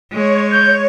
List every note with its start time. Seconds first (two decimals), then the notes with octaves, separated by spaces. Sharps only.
0.13 G#3 C#5
0.52 G6